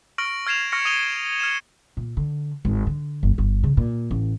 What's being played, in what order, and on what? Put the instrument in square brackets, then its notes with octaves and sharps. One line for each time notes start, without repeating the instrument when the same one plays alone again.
[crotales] C#6 F6 A#6 D7 F#7
F6 G#6 C7 E7 F7
C#6 F6 A#6 C#7
D#6 D#7 F7 G7
F6 G#6 C#7 E7
[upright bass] A#2
D3
G#1
D3
G1
G1
C#3
A#2
A1